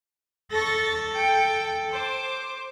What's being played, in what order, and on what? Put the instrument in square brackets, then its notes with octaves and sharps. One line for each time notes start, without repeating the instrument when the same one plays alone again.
[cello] A4 [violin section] C#6 A6 A#6
[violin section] G5
C5 D6